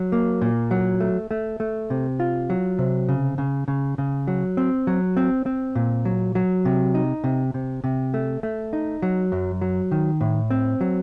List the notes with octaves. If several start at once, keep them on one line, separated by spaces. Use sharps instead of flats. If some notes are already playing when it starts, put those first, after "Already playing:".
Already playing: F#3
A#3
A#2
F#3
A3
A3
A3
C3
F4
F#3
C3
C#3
C#3
C#3
C#3
F#3
C4
F#3
C4
C4
A#2
F#3
F#3
C3
D#4
C3
C3
C3
A3
A3
D#4
F#3
F#2
F#3
D#3
A2
C4
F#3